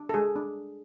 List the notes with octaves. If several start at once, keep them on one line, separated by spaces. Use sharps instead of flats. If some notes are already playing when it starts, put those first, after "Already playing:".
Already playing: D4
A4
G#3 G#4
D4